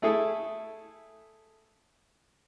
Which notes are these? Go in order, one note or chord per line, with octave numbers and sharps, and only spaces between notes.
A3 E4 G#4 A4